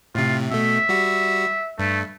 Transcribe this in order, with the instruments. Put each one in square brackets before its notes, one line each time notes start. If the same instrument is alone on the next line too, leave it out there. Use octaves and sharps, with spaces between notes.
[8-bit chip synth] A2 C3 [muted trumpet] F4
[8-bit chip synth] B2 A3 [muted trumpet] E5
[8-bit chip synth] G3 F#4
[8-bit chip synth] G2 [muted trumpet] A3